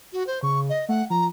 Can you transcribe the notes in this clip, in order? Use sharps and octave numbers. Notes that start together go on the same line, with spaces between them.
F#4
C5
C#3 C#6
D#5
A3 F#5
F3 A#5